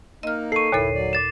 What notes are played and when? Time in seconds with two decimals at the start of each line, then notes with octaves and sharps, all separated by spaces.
0.23 A#3 D#4 D#5 F6
0.52 A4 C#6 C7 D#7
0.72 G1 D#2 A#2 E4 A4 C#5
0.94 F#3 D5
1.13 D6 A6 E7